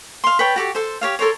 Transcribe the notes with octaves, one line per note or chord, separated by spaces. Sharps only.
F5 C6
B4 C#5 G5 A5
F#4 G4 A4
A4 C5
G4 C#5 F5
A4 A#4 C5 C#5